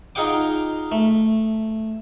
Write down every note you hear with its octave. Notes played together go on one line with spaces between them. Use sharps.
D#4 F4 G#4 F#5 G5 D6
A3